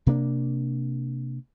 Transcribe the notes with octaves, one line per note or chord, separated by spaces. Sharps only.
C3 A#3 D4